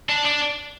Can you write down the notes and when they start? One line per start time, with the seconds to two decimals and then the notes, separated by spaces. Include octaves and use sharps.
0.09 D4
0.25 D4